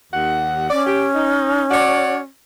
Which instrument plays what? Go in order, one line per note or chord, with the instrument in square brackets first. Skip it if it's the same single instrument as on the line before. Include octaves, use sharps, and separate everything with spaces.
[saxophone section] D#2 F#5
[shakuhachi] C#4 [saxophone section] D5
[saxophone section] G4
D#4
F#4 C#5 D5